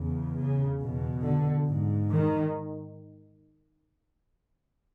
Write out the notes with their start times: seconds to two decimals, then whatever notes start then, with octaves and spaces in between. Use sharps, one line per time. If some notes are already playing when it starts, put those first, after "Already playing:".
Already playing: E2 C#3
0.36 C#3
0.80 E2 B2
1.24 D3
1.68 G#2
2.12 D#3